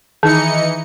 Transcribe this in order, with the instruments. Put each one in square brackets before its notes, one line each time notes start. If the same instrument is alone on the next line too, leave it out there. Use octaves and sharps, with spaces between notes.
[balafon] D#3 [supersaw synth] E3 D#4 C#7